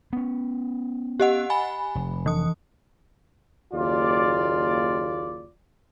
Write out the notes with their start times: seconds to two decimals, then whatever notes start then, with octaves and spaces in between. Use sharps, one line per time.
0.13 B3 C#4
1.20 G4 D#5 F#5
1.50 G#5 B5
1.95 F1
2.26 E3 D#6
3.74 F#1 D#2 F4 D5